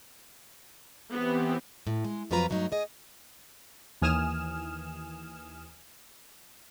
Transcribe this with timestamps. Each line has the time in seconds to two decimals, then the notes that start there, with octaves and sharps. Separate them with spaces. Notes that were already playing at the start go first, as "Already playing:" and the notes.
1.12 E3 B3 C4 G4
1.87 A2
2.04 G#3
2.31 F2 F3 F#3 F4 B4 A#5
2.50 G2 F#3 A3 D#4
2.72 G#4 D#5
4.02 D#2 E3 G#5 D#6 F6 E7